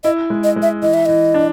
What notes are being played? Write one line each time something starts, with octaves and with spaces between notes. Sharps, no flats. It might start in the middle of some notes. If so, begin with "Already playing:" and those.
E4 D#5
G#3
D#5
G#3
E5
E3 D#5
E5
E3 D#5
D4